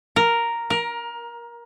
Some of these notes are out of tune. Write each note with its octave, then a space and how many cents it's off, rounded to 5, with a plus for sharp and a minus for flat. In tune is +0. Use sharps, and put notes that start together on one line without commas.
A#4 +0
A#4 +20